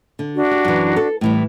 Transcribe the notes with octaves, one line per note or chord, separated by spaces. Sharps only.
D3
D4 F#4
G4
F#2 E3
A4
A2 E3 G3